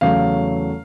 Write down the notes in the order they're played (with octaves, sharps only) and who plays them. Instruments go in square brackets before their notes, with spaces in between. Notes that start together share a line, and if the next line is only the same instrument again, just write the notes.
[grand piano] E2 C#3 F#3 A3 F5